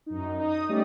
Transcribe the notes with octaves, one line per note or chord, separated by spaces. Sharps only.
F#2 D#4
D#4 D#6
G3 A3 C#4 G4 D5